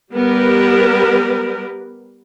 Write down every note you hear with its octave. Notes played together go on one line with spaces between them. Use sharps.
G3 B3 G4 A#4 B4